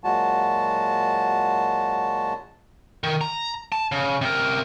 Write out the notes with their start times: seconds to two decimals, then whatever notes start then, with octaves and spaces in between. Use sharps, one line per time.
0.04 A#2 F#3 G#3 F#4 A5
3.04 D#3
3.21 A#5
3.72 A5
3.92 C#3
4.21 C3 A#4